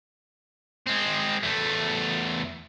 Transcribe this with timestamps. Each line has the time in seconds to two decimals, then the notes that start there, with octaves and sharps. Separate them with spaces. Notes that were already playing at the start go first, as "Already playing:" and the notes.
0.87 G#3 C4
1.43 E2 A3